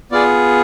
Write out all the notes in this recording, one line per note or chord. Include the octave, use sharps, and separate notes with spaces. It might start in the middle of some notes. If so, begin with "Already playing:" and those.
B3 F4 G#4 D5